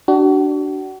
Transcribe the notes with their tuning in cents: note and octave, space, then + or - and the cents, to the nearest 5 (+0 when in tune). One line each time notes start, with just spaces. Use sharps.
D4 +0 F#4 +35